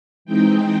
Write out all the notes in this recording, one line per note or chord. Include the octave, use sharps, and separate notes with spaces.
E3 G#3 C4 D#4 G5